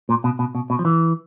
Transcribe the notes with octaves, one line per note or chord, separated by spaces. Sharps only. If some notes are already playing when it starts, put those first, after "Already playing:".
A#2
B2
B2
B2
B2
F3
E3